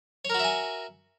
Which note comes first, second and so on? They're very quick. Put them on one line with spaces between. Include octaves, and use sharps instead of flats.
C#5 A#4 F#4 E5 G#5